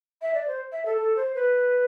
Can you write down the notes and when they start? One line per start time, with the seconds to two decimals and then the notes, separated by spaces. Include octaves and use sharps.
0.22 E5
0.34 D5
0.48 C5
0.72 E5
0.85 A4
0.97 A4
1.16 C5
1.35 B4